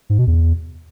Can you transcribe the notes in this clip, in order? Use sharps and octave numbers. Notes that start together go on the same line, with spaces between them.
G#2
B2
E2